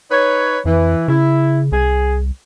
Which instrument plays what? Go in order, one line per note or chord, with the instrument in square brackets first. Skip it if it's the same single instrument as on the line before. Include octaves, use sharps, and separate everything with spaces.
[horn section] D#4 B4 C#5
[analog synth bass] F2 [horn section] E3
[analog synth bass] C#3 [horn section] E4
[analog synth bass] C2 [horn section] G#4